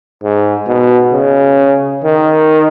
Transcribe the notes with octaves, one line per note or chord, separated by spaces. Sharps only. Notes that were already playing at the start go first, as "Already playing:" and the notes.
G#2
B2
C#3
D#3